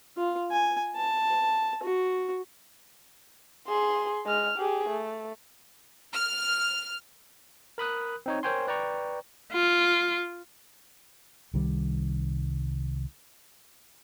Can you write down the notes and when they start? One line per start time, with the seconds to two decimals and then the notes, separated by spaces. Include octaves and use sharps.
0.17 F4
0.51 G#5
0.96 A5
1.83 F#4
3.68 G#4 C6
4.26 G#3 F6
4.58 G4 G#4
4.90 A3
6.13 F6
7.78 A#4 B5 D#6 F#6
8.26 C4 D#4 C#5
8.43 A#4 C5 C#5 G5 G#5 C6
8.68 B4 D5 G5 A#5 C#6
9.52 F4
11.54 C2 D#3 G3